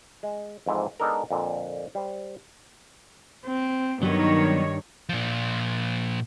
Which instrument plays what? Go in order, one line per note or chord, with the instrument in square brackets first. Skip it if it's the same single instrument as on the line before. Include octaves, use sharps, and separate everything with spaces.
[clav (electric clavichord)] G#3
F2 G#2 E3 C4
G#3 B3 D4 D#4 A4 A#4
F2 A#2 D3
G3 C5
[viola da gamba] C4
[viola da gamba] G2 [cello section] D#3 C#5 [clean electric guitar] F#3 G3 B3
[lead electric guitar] A#2 F3